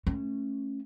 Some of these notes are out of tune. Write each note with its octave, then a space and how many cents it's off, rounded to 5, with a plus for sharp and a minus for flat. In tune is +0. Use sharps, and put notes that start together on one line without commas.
A3 +0 C#4 -15